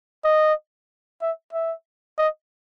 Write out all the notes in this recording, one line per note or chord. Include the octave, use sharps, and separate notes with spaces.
D#5
E5
E5
D#5